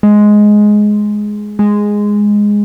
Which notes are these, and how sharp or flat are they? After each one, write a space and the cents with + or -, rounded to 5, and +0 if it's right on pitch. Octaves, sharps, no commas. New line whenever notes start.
G#3 +10
G#3 -5